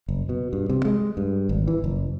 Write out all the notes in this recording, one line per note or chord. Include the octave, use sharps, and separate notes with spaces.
F#1
B2
G2
C3
G#3
G2
G#1
E3
F#1